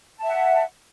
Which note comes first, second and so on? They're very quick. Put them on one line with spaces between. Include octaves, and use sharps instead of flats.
A5 E5 F#5